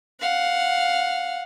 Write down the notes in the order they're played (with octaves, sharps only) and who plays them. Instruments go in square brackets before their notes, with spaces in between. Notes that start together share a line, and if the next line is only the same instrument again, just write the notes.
[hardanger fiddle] F5 F#5